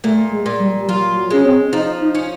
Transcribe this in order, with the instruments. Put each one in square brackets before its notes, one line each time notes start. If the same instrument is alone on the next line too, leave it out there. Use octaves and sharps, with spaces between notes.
[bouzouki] A#2 [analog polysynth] A3
[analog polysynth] G#3
[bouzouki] A#2
[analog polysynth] G3
G3
[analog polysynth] F#3 [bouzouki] F4
[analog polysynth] F#3
[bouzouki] G#3 [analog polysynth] C#4
[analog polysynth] C4
[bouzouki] F3 [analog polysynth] D#4
[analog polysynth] D#4
[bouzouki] C#4